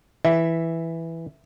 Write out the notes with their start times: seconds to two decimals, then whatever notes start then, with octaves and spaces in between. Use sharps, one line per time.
0.25 E3 E5